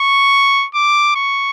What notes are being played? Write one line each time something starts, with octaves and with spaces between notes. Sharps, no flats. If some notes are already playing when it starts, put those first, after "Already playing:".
Already playing: C#6
D6
C#6